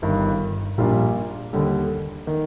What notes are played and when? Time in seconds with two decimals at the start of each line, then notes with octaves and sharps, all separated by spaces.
0.02 G1 G2 D#3
0.78 A#1 A#2 G3 D4 F4
1.53 D#2 D3 G3
2.27 D#3